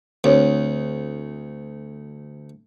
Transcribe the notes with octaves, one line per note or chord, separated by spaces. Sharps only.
D2 C4 D4 C#5